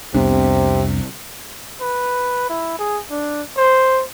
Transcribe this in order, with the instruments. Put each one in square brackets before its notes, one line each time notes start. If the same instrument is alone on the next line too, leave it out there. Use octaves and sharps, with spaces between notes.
[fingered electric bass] C2 [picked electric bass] F2 B3 D4 [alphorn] C3
[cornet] B4
E4
G#4
D4
C5